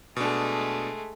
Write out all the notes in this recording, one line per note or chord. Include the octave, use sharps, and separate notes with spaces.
B2 G#3 A3 D4